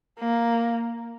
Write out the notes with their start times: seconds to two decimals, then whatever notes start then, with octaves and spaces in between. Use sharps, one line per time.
0.19 A#3